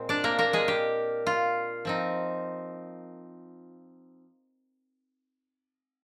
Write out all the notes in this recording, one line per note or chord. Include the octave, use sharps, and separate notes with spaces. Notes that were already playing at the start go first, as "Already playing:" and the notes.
Already playing: A#2 G#3 C4
D4 D5
A#3 A#4
A#3 A#4
G#3 G#4
G4
F4
F3 C4 D#4